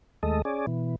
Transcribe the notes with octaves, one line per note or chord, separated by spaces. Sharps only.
D#2 G#3 A3 A4 D#5
C#4 G#4 D5
B2 E3